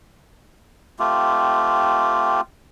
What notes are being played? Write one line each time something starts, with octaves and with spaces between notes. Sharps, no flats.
A3 C4 F4 G4